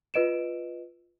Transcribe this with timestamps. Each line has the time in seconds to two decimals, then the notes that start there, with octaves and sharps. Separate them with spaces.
0.14 F4 B4 D#5 D7 E7